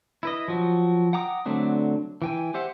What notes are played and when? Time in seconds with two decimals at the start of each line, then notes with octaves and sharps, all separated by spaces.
0.23 E4 B4 D#5
0.48 F3 F#3 F#4
1.13 F#5 G5 A#5 D6 D#6
1.46 D3 F#3 A3 C4 D4
2.22 E3 G5 G#5
2.54 G4 C5 E5 F#5